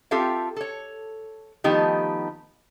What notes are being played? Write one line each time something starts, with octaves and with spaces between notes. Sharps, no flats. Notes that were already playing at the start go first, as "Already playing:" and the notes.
C4 F4 G4 A4 E5 F5
A4 C#5
D#3 F3 A3 B3 D#4 G4